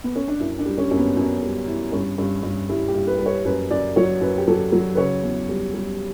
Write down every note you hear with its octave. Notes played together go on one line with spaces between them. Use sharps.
B3
C#4
D4
F#2 E4
D4
G3
C#4
F#2 C#4
B3
F#2
G3
E3
G2 C#4
G2 C#4
G2
G3 E4
G4
G2
B4
G3 B4
C#5
F#2 B4
F#2 D5
F#3 C#5
F#2 B4
G4
F#3 A4
F#3
B4
C#3 C#5
E2
G3
G3